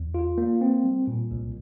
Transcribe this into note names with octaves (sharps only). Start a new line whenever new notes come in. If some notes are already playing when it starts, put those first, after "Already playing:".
Already playing: E2
F4
A#3
C4
G3
A#2
C2